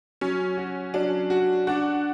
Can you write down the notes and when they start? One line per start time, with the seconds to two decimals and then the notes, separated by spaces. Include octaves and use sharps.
0.21 F#3 C#4
0.57 F#4
0.94 F#3 D4
1.30 F#4
1.67 D4 F#4